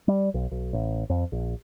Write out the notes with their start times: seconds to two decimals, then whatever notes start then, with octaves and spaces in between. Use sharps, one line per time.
0.08 G3
0.34 B1
0.51 B1
0.73 A1
1.10 F2
1.32 A#1